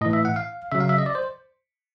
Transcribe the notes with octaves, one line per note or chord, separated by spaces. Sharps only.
A2 E3 D#5
E5
F#5
F5
C#3 F#3 E5
F5
E5
D#5
D5
C5